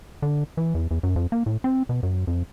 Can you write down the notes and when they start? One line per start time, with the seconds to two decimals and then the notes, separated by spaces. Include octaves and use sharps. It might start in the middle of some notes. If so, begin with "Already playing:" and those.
0.22 D3
0.57 E3
0.75 E2
0.91 E2
1.03 F#2
1.16 F2
1.32 A#3
1.46 A2
1.64 C4
1.89 B2
2.03 F#2
2.27 F2